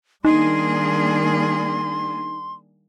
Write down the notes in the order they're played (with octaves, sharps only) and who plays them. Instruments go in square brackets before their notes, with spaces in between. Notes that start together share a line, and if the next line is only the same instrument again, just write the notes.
[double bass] D#3 G3 [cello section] A#3 D4 G#4 [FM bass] D#4 [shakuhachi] C6